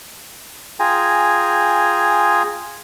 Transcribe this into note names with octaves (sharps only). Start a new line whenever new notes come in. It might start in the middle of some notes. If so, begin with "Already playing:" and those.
F4 G#4 G5 G#5 A#5